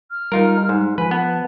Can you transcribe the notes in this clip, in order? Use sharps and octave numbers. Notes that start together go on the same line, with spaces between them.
F6
G3 D#4 F4 A#4
G#2
F3 B4 G#5
B3 A5